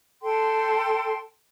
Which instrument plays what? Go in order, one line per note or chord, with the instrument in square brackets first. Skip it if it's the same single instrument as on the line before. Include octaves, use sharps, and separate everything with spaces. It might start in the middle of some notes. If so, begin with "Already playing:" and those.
[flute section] A4 G5 C6